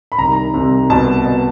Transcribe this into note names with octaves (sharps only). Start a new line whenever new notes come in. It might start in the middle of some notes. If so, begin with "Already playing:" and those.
B5
C2 C3 D#3 A#5
C2 C3 D#3
C2 B2 A5
B2